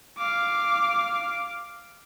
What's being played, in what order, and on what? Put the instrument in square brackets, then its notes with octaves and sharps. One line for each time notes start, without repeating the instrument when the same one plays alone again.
[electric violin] F5 D6